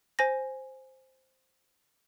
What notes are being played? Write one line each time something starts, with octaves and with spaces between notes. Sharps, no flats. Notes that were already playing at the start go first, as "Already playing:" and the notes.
C5 G#5 A#6